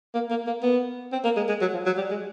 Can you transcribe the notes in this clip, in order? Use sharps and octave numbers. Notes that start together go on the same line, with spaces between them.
A#3
A#3
A#3
B3
C4
A#3
G#3
G#3
F#3
F3
F#3
G3
G#3